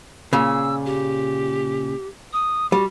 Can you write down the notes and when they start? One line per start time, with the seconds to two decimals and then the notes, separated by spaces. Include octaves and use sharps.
0.33 A#2 C#3 E6
0.85 G4
2.33 D#6
2.72 G3 F#4